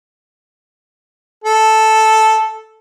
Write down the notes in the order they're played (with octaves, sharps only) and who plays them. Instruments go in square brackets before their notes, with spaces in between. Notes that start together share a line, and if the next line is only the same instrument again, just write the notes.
[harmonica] A4